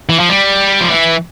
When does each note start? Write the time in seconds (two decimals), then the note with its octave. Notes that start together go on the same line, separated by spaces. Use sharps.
0.09 E3
0.20 F3
0.29 G3
0.81 F3
0.90 E3